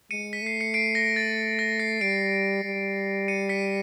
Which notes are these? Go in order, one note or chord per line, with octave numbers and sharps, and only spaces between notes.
G#3 C#7 D#7
B6
A3 C7
C#7
C7 D7
A#6
A6
A#6
C7
G3 C7 D7
G3
C#7 D#7
B6 C#7